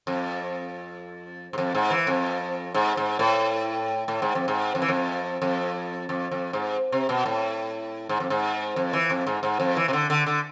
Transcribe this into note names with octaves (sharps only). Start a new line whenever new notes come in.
F2
G#2
F2
G#2
E3
F2
G#2
G#2
A2
A2
G#2
F2
G#2
F2
E3
F2
F2
F2
F2
G#2
C3
B2
A2
G#2
F2
G#2
F2
E3
F2
G#2
G#2
F2
E3
C3
D3
D3
D3